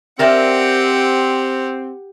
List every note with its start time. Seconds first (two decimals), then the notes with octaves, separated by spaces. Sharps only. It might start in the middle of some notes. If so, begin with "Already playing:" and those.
0.19 C4 G4 A#4 D5 E5 F#5